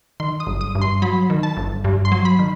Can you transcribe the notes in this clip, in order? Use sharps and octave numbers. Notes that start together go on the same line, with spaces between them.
D#3 C6
D#6
G1
D#6
G2
C6
F#3 B5
D#3
A5
G1
G2
C6
F#3
B5
D#3